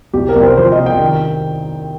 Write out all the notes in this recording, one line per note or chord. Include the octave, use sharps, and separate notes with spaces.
C2 G4
A#4
C2
C5
F3 C5
D#5
C3
G5
D#3